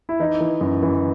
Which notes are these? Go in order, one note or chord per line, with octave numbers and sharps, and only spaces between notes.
E4
E3 D#4
E3
F#2
E3